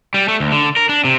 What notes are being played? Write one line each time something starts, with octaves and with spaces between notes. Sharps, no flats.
G3
A3
D2
D3
A#4
D4
C3